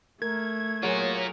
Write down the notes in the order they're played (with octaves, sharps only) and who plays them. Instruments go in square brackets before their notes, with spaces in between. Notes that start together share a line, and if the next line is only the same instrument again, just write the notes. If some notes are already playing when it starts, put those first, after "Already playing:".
[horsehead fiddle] A3 [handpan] A#4 [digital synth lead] G#6
[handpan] F#3 G#4 F#5 [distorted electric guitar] F4 A#4 [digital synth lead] C#5